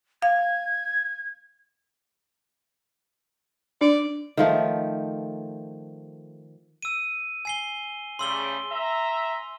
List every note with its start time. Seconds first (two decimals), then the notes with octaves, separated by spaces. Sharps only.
0.22 F5 G#6
3.81 D4 D5
4.37 D#3 F3 A3
6.82 E6 D#7
7.45 G#5 C7 G7
8.19 C#3 G3 A3 C6 E6 G7
8.71 E5 A#5